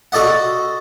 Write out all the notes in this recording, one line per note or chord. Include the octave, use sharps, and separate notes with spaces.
F#4 A4 D5 D#5 F#5